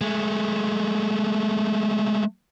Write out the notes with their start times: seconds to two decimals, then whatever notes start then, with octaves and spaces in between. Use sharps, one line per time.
0.01 G#3 A3